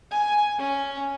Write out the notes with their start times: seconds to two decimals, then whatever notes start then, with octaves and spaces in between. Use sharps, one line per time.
0.11 G#5
0.59 C#4